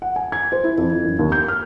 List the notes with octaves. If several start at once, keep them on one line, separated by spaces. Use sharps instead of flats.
F#5
G#5
G#6
C5
E4
F2
E3
F#2
D#2
G6
F6